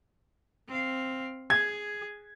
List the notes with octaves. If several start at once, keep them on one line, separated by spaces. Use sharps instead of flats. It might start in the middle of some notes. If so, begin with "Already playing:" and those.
C4 F5
G#4 G#6